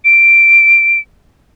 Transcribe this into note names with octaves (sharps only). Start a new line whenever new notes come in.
D7